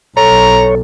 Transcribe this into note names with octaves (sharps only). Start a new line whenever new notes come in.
B1 A4 C#5 A#5